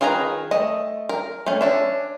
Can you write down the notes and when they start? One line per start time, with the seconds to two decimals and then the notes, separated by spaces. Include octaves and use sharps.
0.01 D#3 F4 G#4 B4 A#5
0.51 A3 D#5
1.09 A#4
1.46 A3 C#4
1.61 C#4 D4 E5